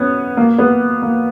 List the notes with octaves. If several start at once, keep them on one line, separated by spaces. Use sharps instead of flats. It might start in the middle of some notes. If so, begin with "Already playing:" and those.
Already playing: B3 C#4
A#3
B3
A#3